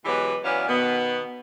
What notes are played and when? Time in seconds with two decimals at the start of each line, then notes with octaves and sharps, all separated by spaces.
0.05 B2 E3 F#3 G#3 G4 B4
0.44 E3 F#3 B3 C#4 D5 F5
0.67 B2 D#3 B3